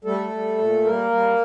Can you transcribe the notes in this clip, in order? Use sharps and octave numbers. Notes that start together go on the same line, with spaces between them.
G3 A3 A4
G3
A#2
G3 A#3 A#4
G3